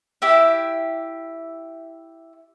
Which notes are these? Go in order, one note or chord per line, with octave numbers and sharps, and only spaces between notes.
E4 G4 E5